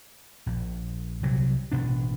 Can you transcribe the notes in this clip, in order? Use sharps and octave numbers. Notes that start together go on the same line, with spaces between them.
A#1
C2 F#3 G3
A1 B2 D4